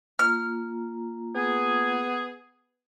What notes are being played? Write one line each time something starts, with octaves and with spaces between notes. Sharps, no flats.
A#3 F4 A#5 F6
B3 G#4